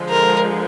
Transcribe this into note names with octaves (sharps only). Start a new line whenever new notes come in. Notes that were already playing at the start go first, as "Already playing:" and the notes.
Already playing: D3 F3 G#3
A#4